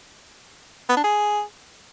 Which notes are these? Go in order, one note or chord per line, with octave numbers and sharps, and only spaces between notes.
B3
D4
G#4